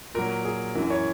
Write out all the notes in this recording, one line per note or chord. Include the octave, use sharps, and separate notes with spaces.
A#2 F#3 A#4
G#4
F#2 E3 A#4
C#5